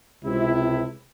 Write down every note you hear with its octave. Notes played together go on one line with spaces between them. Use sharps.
C#2 C3 E4